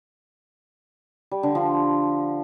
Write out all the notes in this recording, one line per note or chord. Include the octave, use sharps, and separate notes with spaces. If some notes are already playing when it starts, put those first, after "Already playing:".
G3
D3
F3